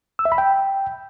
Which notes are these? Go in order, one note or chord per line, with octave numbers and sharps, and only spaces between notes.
E6
E5
B5
G5